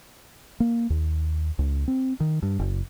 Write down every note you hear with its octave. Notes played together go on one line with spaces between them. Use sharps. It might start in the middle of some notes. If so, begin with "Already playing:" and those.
A#3
D#2
C#2
C4
D#3
G2
F#1